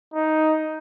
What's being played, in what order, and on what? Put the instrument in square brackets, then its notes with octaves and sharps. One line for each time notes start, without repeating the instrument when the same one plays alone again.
[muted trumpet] D#4